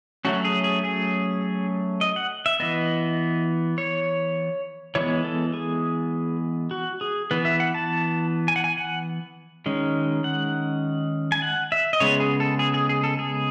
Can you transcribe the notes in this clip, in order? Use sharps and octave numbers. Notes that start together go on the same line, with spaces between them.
F#3 A3 C#4 F#4
G#4
G#4
G#4
D#5
F#5
E5
E3 B3 D#5
C#5
E3 G#3 B3 C#5
A4
G#4
F#4
G#4
E3 B3 B4
E5
F#5
A5
G#5
F#5
G#5
F#5
D#3 G#3 C#4
F#5
G#5
F#5
E5
D#5
C#3 G#3 B3 C#5
G#4
A4
G#4
G#4
G#4
A4
G#4